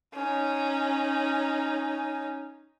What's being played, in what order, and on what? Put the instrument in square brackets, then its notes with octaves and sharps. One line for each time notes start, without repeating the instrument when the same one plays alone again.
[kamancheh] C#4 D#4